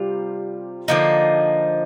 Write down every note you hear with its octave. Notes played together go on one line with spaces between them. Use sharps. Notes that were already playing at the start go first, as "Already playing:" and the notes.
Already playing: C3 G3 F4
D3 F3 A#3 D#4